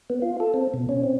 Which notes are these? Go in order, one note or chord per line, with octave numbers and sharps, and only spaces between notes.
B3
F4
A4
C4
B2
C#4
C4